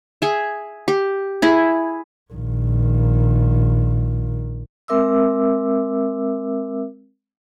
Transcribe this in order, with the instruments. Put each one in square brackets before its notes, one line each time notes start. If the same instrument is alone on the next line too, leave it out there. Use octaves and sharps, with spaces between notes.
[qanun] G#4 E5
G4
E4 G#4
[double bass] A#1 D#3
[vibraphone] G#3 C4 A#4 E5 D6 E6